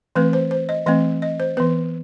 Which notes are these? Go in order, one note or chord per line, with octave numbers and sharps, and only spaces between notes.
E3 A3 C4 B4
C5
C5
D#5
E3 A3 C4 D#5
D#5
C5
E3 B3 B4